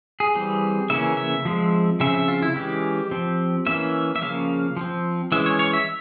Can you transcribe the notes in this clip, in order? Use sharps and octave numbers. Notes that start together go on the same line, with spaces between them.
G#4
E3 G3 C4
C#3 E3 A#3 C#4 E5
E5
F3 G#3 C4
C#3 F3 C4 E5
E5
F4
E4
E3 G#3 C#4 G4
F3 C4
E3 A#3 C#4 E5
E5
C#3 F3 A#3 C#4 F5
F3 C4
E3 G#3 C#4 E5
C#5
C#5
E5